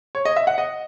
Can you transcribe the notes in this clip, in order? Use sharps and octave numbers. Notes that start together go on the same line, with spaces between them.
C#5
D#5
E5
F#5
D#5